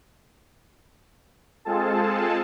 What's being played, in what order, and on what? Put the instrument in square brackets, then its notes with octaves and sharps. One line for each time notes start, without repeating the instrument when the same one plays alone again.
[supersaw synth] G#3 C4 F4 G#4 A4 A5